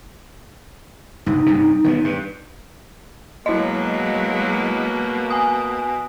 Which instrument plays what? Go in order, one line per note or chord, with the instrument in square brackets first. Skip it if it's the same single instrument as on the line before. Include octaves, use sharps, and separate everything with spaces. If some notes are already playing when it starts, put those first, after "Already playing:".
[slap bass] C2 G2 [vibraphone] D#4
[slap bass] G2 C3
D#3 A#3 B3
G2
[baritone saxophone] B2 [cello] F#3 G#3 [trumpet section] A#3 [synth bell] E4 D#5
[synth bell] G#5 D#6